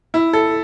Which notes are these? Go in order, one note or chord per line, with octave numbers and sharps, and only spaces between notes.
E4
A4